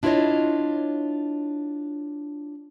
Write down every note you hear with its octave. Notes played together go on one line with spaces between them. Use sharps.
D4 E4 F4 A#4 C#5 D#5